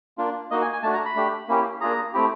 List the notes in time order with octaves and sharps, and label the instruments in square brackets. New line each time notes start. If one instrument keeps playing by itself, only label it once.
[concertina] A#3 D4 F4
A#3 D#4 F#4 D#5
G#5
G#5
A3 D4 F#4 A5
A#5
B5
A3 D4 G4
A#3 C#4 E4 G4
A#3 D4 F4 G#4 A#5
A3 C4 E4 G4